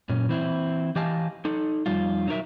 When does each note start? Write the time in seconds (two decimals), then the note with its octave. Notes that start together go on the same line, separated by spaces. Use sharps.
0.09 F#2 A#2 C#4
0.29 E3 C4 E4
0.96 E3 G4 D#5 F5 G#5 A5
1.45 D#4 A4
1.86 F2 G3 D#4 F4
2.27 F#3 D#4 A#4 E5